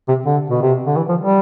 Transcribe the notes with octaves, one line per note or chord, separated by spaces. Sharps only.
C3
D3
B2
C3
D3
E3
F3
G3